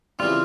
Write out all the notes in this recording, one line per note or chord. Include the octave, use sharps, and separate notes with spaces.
C#3 E3 G3 C4 F4